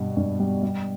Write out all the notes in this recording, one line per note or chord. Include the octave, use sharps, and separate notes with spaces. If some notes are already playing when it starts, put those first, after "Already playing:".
Already playing: G2 B2 G3
G2
G3
G3